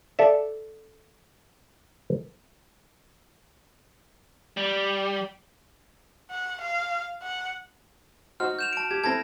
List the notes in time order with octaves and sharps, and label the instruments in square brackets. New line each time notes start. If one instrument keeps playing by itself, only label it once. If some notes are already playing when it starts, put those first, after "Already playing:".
[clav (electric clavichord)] A4 D5 E5
[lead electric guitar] G3
[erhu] F#5
F5
F#5
[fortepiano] D#4 F#4 C5 [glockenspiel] F6
[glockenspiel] G6 E7 F7
A5 D7
[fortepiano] G4 [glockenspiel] G#6
[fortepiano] C4 E4 A4 [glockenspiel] G#6 A#6